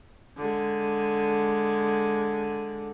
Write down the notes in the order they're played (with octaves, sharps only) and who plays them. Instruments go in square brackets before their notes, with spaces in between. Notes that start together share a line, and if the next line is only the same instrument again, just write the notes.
[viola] D3 G#3